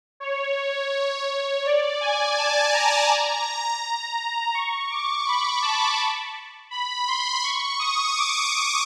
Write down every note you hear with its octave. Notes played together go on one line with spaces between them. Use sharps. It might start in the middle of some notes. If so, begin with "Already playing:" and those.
C#5
D5
G#5
A5
A#5
C#6
D6
B5
A5
B5
C6
C#6
D#6
D6
C#6